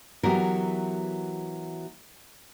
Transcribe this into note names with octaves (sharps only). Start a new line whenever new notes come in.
E3 F#3 B3 F#4 G4 A#4